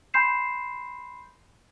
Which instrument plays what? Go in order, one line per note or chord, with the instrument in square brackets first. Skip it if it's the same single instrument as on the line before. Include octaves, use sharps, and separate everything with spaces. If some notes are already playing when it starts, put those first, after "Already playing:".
[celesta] G#5 B5 C6 G6 C7 E7